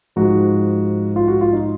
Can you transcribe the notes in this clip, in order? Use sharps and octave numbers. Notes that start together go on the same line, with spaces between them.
G#2 F3 F#4
F4
F#4
F4
D#4